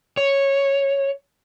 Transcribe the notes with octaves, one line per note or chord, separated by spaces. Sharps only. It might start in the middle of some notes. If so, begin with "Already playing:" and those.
C#5